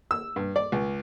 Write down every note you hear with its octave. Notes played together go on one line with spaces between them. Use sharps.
E6
G2
D5
C#2